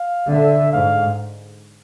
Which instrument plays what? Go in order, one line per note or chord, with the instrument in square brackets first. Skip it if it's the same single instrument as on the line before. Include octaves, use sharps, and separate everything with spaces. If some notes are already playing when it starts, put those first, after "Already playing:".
Already playing: [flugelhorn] F5
[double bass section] D3 [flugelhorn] E5
[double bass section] G#2 [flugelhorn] F5